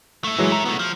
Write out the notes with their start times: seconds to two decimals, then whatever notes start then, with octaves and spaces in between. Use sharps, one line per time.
0.24 A3 E4
0.38 E3 F#3 G#3
0.52 A#5
0.65 A3 B3
0.79 F3